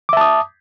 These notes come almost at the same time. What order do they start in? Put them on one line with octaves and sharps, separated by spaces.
D6 E5 A5 D#6